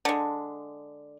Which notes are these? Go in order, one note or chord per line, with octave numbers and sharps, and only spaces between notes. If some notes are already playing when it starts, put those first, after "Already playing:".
D3 G#3